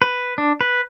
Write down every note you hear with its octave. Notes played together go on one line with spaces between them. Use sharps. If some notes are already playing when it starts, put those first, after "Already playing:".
B4
D4
B4